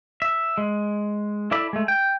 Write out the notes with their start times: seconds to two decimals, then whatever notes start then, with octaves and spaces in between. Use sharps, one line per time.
0.22 E5
0.58 G#3
1.51 E4 A4 D5 E5 B5
1.73 G#3 A3
1.88 G5